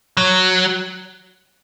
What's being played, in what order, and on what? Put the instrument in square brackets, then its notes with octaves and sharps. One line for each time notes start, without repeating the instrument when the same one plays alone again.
[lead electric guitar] F#3